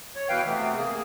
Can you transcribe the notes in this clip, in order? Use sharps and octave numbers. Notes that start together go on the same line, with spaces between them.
C#5
B2 E3 B4 F5 G5
C3 E3 A3 B3
A#3 G#4